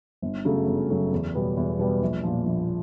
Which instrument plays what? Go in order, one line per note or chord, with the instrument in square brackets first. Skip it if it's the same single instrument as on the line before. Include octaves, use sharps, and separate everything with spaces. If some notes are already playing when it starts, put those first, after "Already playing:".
[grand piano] G1
F#2 C#3 F#3 A3
G1
F#2 C#3 F#3 A3
E2
B2 G3 B3
E2
B2 G3 B3
A#1
A#2 F3
A#1